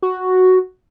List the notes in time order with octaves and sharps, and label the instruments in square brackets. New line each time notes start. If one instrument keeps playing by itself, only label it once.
[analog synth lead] F#4